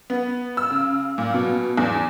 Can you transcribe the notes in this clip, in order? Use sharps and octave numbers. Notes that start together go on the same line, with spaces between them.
B3
E6
C#3
A#2
B2
E2